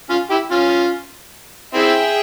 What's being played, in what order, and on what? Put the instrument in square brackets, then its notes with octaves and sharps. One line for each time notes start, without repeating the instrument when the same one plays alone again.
[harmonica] C#4 F4
E4 G4
C#4 F4
[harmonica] C4 E4 [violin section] G#4 E5 G5